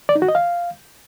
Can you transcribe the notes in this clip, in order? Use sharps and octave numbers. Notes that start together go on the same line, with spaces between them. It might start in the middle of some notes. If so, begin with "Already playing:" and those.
D5
D#4
F#4
D#5
F5